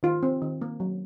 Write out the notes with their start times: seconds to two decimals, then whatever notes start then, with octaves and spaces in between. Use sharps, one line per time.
0.03 D#3 F4
0.23 C4
0.42 D#3
0.62 A#3
0.80 F#3